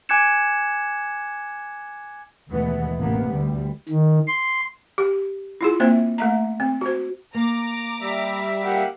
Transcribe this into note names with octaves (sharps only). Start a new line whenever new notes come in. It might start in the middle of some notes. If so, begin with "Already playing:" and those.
G#5 D6 F#6 G#6 C#7 E7
D#2 B2 E3 G#3 A3 B3
A1 C3 A#3 B3
D2 G3
D#3
C6
G4
E4 F4 G#4
A#3 C4 C5 E5
A3 E5 A#5
C4
F#4 C5
A#3 A#5 D6
G3 E5
A#3 G4 F#5